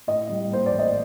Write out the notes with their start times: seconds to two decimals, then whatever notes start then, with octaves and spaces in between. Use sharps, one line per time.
0.07 A2 D#5
0.29 G3
0.50 A#3 C5
0.66 A1 D5
0.79 D#5